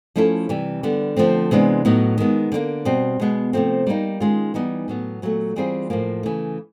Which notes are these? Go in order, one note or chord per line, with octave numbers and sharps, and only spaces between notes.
F3 A3 C#4 E4 A4
C3 E3 G3
D3 G3 B3
D3 F3 A3 C4
C3 E3 G#3 B3 D4
A2 F#3 B3 D#4
D#3 G#3 B3
D3 G3 A#3
B2 G3 C4
B2 G#3 B3
C3 F3 A3 C4
G3 A#3 D#4
D#3 G#3 C#4 F4
E3 G3 B3 D#4
A2 F#3 B3
A#2 F#3 A3
E3 G3 C4 F4 G#4
A2 F3 A#3
C#3 E3 A3